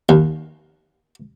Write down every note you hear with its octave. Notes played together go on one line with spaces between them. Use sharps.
D#2